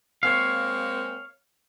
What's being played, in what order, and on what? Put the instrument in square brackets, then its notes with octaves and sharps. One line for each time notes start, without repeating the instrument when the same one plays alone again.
[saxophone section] G#3 A#3 C4 [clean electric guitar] C#5 F5